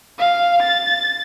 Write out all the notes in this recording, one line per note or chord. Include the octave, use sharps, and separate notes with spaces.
F5
A6